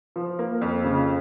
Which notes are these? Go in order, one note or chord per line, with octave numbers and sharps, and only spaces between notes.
F3
A#3
F2
C#3